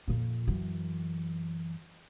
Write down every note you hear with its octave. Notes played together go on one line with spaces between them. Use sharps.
F2 A#2
F#2 E3